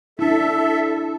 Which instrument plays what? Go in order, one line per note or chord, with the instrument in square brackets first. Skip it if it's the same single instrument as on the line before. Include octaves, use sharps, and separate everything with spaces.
[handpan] D4 E4 [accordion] A4 E5